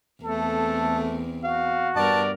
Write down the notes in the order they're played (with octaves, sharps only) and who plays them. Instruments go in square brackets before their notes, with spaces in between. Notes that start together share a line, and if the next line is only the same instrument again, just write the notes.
[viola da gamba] E2 C4 [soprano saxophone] A3 [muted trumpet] A4
[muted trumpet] F#4 [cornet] F5
[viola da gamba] G2 B3 A#4 [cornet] D5 [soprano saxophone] A5